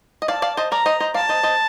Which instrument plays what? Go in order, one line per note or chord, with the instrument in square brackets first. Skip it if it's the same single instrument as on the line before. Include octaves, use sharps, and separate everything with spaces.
[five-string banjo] D#5
[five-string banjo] D5 F5 [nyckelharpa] A5
[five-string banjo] D5 F5
C5 D#5
[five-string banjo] A#4 D5 [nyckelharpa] A#5
[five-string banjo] C5 D#5
C5 D#5
[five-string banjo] D5 F5 [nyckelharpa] A5
[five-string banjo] C5 D#5
C5 D#5